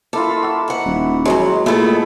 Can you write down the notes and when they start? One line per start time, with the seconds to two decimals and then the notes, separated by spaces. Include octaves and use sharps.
0.13 A#3 E4 F4 A4
0.43 F#4 E5
0.68 G#2 F#5
0.86 D#1
1.25 E2 G#2 F#3 G#3
1.66 A#2 A3 B3 E4 G#4